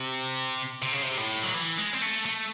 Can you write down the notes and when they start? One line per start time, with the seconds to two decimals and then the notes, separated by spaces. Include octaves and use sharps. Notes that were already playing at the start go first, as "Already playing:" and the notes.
Already playing: C3
0.82 C3
0.92 C#3
1.02 C3
1.18 A2
1.43 F#3
1.54 E3
1.78 G#3
1.93 C4
2.02 A3
2.26 A3